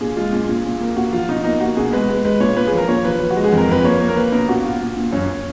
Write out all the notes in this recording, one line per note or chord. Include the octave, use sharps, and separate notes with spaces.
A#2 G#4
G#3 F4
A#2 G#4
A#2
A#2
A#3
A#2 F#4
F3 F4
B2 D#4
A#3 D#4
A#3 F#4
B2 G#4
G#3 B4
G#3
G#3 B4
A#2 C#5
A#2 B4
G#4
F3
A#4
A#2 C#5
F3 B4
F3
F#4
G#3
G#4
F2
A#4
F2 B4
A#3 C#5
A#3
A#4
A#3 B4
B2 A#4
A#2 F#4
A#2 F4
A#2
A#2
F#2 C#5